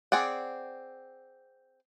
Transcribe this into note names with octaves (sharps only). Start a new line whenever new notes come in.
C4 G#4 D5 F#5